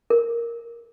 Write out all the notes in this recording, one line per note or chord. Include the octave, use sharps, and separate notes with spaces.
A#4